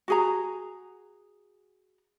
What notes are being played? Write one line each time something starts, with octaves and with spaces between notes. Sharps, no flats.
F#4 G#4 A#5